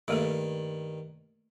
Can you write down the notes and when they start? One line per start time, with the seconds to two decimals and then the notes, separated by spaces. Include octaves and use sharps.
0.08 G2 D#3 A3 A#3 A4